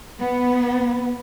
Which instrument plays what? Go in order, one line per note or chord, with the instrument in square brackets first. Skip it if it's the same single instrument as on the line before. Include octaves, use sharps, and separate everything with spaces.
[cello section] B3